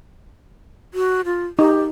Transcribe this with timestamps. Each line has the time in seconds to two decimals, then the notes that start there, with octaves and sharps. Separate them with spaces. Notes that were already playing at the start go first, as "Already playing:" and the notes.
0.94 F#4
1.25 F4
1.59 D#4 G4